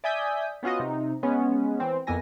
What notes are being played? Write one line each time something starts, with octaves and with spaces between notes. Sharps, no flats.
D5 E5 G#5 D#6 G6 B6
B3 C#4 F4 F#4 D#5
C3 D#4
G#3 B3 C#4
E3 C4
F2 A#3 B3 E4 G#5 A#6